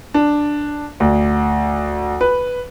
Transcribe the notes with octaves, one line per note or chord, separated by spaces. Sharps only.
D4
D2
B4